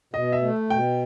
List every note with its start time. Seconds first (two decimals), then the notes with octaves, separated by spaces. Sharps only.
0.14 B2 D#5
0.32 E5
0.42 A3
0.70 B2 G5